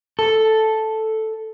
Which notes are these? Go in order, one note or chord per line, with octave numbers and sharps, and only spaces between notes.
A4